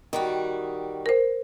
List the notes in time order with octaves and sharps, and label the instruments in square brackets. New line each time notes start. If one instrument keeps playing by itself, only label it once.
[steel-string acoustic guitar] D#3 G3 F#4
[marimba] A#4 C5